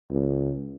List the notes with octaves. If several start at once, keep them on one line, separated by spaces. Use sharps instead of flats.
C#2